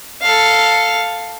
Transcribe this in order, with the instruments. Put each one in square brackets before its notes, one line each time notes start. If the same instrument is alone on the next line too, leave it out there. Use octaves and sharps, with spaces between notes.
[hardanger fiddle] A4 F5